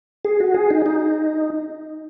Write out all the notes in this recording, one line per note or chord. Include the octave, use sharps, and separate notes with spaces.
G#4
F#4
G#4
D#4
D#4